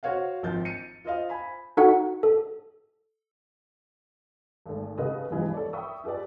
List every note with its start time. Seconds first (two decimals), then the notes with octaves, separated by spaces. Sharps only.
0.03 F#4 C5 C#5 F5 F#5
0.42 G#1 F3 G6 A6
0.65 C#7 D#7
1.04 F4 C5 D#5 F5
1.30 G#5 B5
1.77 D#4 F#4 A4 F#5
2.23 A4
4.66 G#1 A3
4.98 C#3 A4 B4 D#5 F#5 D#6
5.30 B1 G2 C3 E3 F3 G#3
5.54 A4 C#5 D5
5.73 E5 G5 B5 C#6 D#6 E6
6.04 F4 G4 G#4 B4 D5